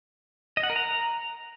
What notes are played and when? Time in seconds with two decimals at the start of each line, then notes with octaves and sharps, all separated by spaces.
0.57 D#5
0.63 F#5
0.70 A#4
0.76 A#5